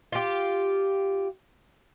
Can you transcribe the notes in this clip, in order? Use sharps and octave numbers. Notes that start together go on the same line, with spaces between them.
F4 G4